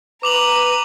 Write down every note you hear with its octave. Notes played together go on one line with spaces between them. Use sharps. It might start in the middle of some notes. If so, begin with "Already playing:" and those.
B4 A#5 D6 D#7 F7 F#7